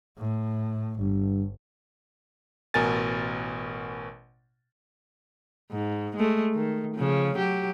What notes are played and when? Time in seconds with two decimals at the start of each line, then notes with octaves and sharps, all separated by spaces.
0.18 A2
0.99 G1 G2
2.74 A1 B2 A#4 G#5 A6
5.72 G#2
6.17 G#3 A3
6.54 D#3
6.96 C#3 F3
7.36 F#3 G4